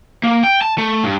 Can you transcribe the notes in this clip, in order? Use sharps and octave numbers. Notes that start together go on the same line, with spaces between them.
A#3
G5
A5
A3
G2